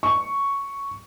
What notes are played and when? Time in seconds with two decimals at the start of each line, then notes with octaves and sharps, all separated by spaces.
0.03 C#6